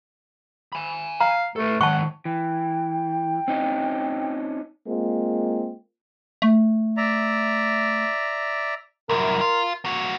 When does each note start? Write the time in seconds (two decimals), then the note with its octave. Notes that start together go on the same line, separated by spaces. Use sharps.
0.73 G#5 B5
1.20 F5 A#5
1.56 A3 A4 B4
1.81 D#3 G#3 F#5 A5 C#6
2.25 E3 G5
3.48 C4 C#4 D#4
4.87 G#3 A#3 C4 F4
6.42 A3
6.97 D5 E5 A#5
9.09 C2 F#2 A#4
9.41 F4
9.85 A#3 F#4